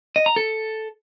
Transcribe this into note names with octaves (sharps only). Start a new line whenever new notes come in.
D#5
A#5
A4